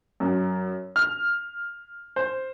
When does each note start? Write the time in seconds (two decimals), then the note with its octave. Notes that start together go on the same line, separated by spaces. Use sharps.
0.20 F#2
0.96 F6
2.16 C5